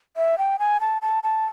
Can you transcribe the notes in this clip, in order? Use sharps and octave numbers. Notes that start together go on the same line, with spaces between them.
E5
G5
G#5
A5
A5
A5